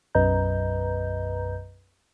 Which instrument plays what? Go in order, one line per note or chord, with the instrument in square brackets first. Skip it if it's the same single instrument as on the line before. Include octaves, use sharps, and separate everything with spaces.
[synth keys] B1 F#2 B4 D#5 A#5 G6